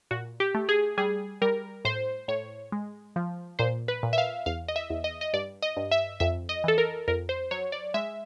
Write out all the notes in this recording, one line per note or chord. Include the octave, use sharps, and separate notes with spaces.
A#2 F#4
G4
A3
G#4
G3 G#4
G3 A#4
A2 C5
A2 C#5
G#3
F3
A#2 C5
B4
A#2
E5
F5
E2 F5
D#5
E5
E2
D#5
D#5
G2 D5
D#5
G2
E5
F2 E5
D#5
E3 A4
A#4
F2 A#4
C5
F#3 C#5
D5
G#3 E5